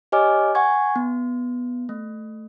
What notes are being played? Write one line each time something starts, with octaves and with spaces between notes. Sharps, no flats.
G4 C#5 D#5 G#5 D6 F6
F#5 G#5 C#6 G#6
B3
A3